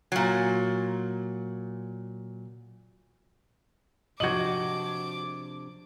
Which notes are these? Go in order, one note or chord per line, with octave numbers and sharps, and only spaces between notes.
A#2 F#3
C3 F3 D4 F#4 D#5 D6 G#6 F#7